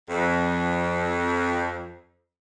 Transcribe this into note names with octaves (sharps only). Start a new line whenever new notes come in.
F2